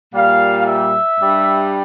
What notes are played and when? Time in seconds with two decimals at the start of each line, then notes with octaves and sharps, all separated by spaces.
0.13 A#2 G3 F5
0.66 E5
1.18 G2 G3